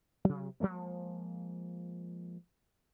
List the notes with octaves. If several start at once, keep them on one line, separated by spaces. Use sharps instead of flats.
C3 F#3
F3 F#3 G#3 A#3